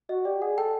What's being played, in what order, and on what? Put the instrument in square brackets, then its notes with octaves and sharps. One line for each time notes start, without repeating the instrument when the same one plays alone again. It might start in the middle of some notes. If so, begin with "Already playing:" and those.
[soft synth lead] F#4 [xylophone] D#5
[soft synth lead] G4 [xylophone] D5
[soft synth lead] G#4 [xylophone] F#5
[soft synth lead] A4 [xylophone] G5